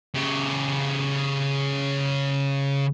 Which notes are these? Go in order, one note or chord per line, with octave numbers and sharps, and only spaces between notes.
C#3 G4